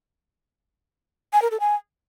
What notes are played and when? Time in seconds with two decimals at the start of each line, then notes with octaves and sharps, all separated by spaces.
1.33 G#5
1.42 A#4
1.51 A4
1.60 G#5